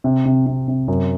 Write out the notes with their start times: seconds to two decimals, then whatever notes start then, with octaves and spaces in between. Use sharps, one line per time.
0.04 C3
0.26 C3
0.46 C3
0.68 C3
0.88 F#2